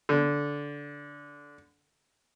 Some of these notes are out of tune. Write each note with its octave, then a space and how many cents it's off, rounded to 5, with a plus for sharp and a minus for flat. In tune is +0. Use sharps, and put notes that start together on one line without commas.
D3 -15